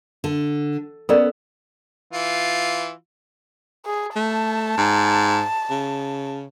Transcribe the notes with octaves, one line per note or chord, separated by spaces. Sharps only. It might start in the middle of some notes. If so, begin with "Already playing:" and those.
D3
B3 C#4 A4 A#4 D5
E3 F4
G#4
A3 A5
G#2
C#3